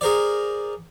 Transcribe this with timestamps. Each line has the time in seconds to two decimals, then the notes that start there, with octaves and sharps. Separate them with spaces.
0.01 G#4 A#4 C5 D5